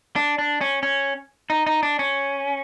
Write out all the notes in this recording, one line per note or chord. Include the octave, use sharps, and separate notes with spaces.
D4
D4
C#4
C#4
D#4
D#4
D4
C#4